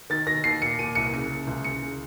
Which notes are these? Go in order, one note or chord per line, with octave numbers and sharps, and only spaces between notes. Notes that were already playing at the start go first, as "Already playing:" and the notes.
D#3 A6
D#3 A#6
D#2 C7
A#2 C#7
A#2 D#7
C2 C#7
C#3 C#7
C#3
C#2
C#3 C#7
C#3